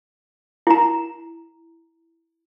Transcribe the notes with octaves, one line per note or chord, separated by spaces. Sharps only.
E4 A#5